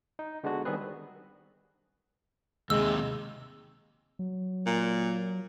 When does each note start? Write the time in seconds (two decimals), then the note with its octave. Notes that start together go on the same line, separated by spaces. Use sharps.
0.19 D#4
0.44 D3 G#3 B3 D4 F#4
0.65 D#3 G3 B3 C4 G#4 B4
2.70 D#2 C3 G#3 E6
4.19 F#3
4.66 A#2